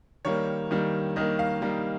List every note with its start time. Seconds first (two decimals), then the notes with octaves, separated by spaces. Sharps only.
0.25 D#3 G3 A#3 C#5
0.71 D#3 G3 A#3
1.16 D#3 G3 A#3 D#5
1.39 F5
1.62 D#3 G3 A#3